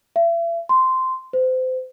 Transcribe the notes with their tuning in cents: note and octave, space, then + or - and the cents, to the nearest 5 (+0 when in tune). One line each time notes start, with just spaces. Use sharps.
E5 +40
C6 -10
C5 -30